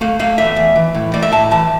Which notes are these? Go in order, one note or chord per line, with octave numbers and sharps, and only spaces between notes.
A3 F5
A3 F5
E2 E5
E2
E3
A2
A3 D5
E5
A2 A5
E3 A5